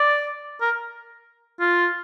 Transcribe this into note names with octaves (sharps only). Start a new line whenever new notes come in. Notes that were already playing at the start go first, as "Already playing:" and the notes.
Already playing: D5
A#4
F4